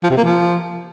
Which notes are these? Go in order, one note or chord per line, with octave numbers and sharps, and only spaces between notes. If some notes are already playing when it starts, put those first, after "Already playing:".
F3
C3
A#3
F3